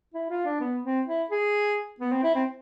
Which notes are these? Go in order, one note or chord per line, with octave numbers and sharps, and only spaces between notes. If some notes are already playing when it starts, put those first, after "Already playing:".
E4
F4
D4
B3
C4
E4
G#4
B3
C4
E4
C4